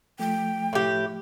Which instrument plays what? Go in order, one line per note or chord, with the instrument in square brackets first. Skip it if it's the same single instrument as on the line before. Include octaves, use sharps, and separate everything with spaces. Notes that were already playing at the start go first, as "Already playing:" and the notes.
[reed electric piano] F3 A3 [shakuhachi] G5
[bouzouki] A2 G4